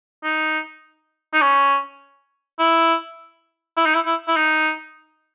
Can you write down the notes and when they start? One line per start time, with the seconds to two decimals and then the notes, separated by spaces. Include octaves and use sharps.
0.24 D#4
1.34 D#4
1.41 C#4
2.59 E4
3.77 E4
3.85 D#4
3.95 E4
4.06 E4
4.27 E4
4.36 D#4